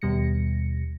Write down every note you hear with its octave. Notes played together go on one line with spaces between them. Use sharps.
D#2 B2 G3 A#6 C#7